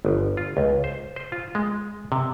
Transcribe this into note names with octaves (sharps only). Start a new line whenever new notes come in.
G1
F4
C#2
C5
C5
F4
G#3
C3